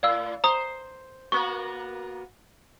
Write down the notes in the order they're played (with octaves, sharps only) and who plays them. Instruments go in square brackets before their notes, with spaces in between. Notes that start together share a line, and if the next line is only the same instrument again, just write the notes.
[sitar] A2 [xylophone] D5 F5 E6
[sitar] C5 [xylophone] A#5 D#6
[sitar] A#3 B3 F#4 [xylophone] C#6